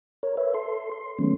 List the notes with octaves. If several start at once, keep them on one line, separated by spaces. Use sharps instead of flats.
A#4 C#5
B4 C#5 E5
A4 C6
C6
D#3 F#3 G#3 A3 B3 C#4